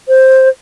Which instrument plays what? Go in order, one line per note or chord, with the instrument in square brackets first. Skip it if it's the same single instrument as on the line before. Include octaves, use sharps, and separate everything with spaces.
[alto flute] C5